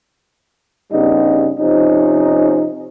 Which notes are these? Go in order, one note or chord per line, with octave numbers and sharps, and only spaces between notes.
G2 C#3 G3 B3 D#4
C3 F3 C#4 D#4